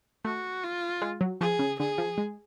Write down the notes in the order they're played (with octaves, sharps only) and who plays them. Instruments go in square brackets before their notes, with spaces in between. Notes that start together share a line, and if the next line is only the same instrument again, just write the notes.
[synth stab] A3 [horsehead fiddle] F#4
[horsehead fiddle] F4
[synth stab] G#3
F#3
[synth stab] F3 [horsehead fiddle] G#4
[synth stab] C#3
[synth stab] D3 [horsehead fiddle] G#4
[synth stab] F3
G#3